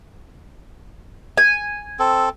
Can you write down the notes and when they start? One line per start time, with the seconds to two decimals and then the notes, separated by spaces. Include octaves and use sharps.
1.38 G#5
1.99 C4 A4